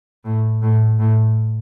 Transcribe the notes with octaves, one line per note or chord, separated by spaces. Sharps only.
A2
A2
A2